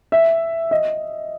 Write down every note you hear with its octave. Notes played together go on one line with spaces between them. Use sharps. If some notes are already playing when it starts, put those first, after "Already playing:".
E5
D#5